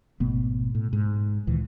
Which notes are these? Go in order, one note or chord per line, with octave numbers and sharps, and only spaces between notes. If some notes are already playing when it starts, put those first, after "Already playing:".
G#1 B2 A3 B3
A2
G#2
D2 A#2 D#3 E3